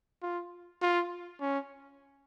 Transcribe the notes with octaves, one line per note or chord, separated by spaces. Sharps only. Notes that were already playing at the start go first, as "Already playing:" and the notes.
F4
F4
C#4